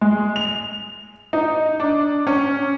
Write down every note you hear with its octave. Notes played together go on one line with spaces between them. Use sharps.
G#3
F7
D#4
D4
C#4